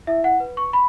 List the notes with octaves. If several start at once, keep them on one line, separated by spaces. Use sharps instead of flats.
E4 E5
F#5
B4
C#6
B5